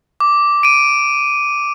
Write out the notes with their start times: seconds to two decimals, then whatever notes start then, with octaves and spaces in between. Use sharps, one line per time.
0.20 D6
0.63 D7 D#7